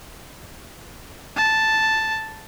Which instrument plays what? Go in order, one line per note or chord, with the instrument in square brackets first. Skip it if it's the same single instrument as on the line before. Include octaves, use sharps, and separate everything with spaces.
[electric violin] A5